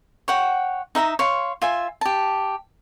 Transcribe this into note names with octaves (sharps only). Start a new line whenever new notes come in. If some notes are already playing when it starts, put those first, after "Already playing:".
C#5 F#5 G5
D#4 E5 F#5 A#5
C#5 F5 C6
F4 E5 G#5
G4 A5